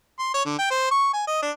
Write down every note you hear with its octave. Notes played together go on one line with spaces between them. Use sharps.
C6
C#5
D3
G5
C5
C#6
G#5
D#5
D4